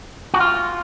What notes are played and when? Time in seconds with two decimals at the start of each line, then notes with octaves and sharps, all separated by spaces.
0.34 F#4
0.40 F4